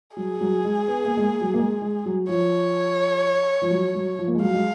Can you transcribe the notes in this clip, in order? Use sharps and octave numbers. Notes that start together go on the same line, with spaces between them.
F#3 G#4
F#3
G#3
B3
A#3
G#3
A#3
F#3
A#3
G#3
G#3
F#3
F3 C#5
F3
F#3
F#3
F3
A#3
G#3
F#3 F5
G#3